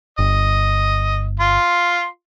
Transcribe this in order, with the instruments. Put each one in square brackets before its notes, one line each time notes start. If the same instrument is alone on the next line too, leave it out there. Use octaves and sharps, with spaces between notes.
[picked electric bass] G1 [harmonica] D#5
[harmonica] F4 C6